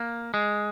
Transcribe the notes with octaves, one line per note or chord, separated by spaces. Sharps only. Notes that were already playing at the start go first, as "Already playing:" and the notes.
Already playing: A#3
G#3